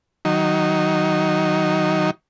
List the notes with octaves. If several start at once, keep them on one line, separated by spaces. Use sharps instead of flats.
D#3 F#3 D#4